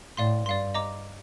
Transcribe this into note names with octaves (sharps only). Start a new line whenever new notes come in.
A2 D5 F5 C6
G2 D5 F5 C6
D#5 A#5 D6